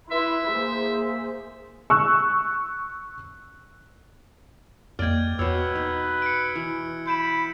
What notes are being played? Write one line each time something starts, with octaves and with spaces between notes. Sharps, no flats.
E4 B4 E5 C6
A#3 G#4 C5
C#6 E6 F#6
F2 A#3 D5 D#5 G5 F6 G#6
E2 B2 B4 C#5 E6
D#4
C#7 D7
E3
B5 G6 D7 E7